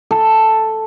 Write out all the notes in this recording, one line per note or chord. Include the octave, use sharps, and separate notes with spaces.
A4